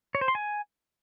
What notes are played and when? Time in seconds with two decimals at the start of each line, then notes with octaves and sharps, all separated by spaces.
0.15 C#5
0.21 C5
0.28 C6
0.35 G#5